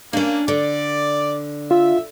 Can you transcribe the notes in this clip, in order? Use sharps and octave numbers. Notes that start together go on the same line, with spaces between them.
A#3 C#4 D4
D3 D5
F4 E5